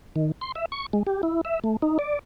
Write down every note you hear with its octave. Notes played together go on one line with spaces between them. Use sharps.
D#3
C6
E5
C#6
G#3
G4
E4
E5
A3
D#4
D5